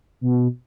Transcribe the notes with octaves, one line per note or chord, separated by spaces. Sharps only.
B2